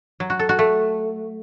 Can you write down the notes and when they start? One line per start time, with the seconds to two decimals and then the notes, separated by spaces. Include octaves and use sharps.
0.20 F#3
0.30 F#4
0.39 A4
0.49 F#4
0.59 A3